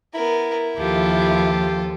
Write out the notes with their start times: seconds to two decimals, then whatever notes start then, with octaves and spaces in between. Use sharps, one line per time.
0.14 B3 E4 A#4
0.78 D#2 F3 F4 G4 A4